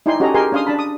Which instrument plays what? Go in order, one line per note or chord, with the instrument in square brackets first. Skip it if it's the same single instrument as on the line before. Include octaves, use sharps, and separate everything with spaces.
[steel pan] D#4 E4 D5 G5 G#5 C6
C#4 F#4 G4 A4 D#5 A#5
G4 G#4 A#4 G#5 C6
C#4 D4 F5 C6 D#6
D4 A5 B5
D#6